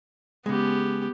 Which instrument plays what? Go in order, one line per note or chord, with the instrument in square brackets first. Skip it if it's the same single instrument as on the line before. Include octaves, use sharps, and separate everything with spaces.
[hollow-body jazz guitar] C#3 G#3 [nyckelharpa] B3 G4